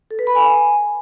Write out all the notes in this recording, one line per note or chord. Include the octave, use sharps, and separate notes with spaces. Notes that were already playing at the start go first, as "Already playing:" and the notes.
A4
B4
B5
G#5